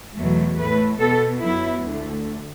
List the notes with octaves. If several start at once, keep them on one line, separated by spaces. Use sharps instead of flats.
E2 B2 F#3 A3
A2 A3 B4
B2 B3 A4
F#2 F#3 B3 E4
D2 D3 A3